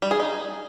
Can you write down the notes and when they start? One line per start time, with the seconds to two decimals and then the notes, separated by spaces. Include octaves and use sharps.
0.02 G3
0.11 G#4
0.20 D#4